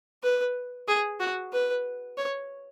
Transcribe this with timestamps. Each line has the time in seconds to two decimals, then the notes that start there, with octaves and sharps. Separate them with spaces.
0.23 B4
0.88 G#4
1.20 F#4
1.53 B4
2.17 C#5